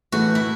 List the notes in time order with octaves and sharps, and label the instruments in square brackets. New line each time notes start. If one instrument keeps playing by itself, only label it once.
[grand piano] A2 E3 A3 [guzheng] F#4
[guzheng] E4